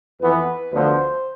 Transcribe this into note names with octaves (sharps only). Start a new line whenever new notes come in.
F2 E3 B3 B4
D2 D3 F3 B3 C5